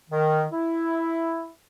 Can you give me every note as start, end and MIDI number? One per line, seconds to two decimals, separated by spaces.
0.10 0.45 51
0.52 1.51 64